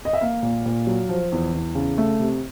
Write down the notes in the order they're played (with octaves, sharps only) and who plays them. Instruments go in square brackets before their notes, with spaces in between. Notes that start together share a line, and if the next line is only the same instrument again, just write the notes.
[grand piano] D#5
E5
A#3 F5
A#2
A#2
F#3
F3
E2
E2
C#3
A3
C3